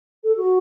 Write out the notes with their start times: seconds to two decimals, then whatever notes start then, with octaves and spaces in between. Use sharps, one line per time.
0.24 A4
0.37 F#4